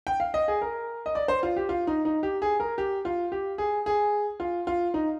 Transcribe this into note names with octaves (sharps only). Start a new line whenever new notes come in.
G5
F5
D#5
G#4
A#4
D#5
D5
C5
F4
G4
F4
D#4
D#4
G4
G#4
A#4
G4
F4
G4
G#4
G#4
F4
F4
D#4